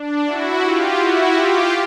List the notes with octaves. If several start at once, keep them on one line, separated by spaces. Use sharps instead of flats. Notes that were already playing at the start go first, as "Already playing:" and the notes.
Already playing: D4
E4 F#4
F4 G4
E4 F#4
F4 G4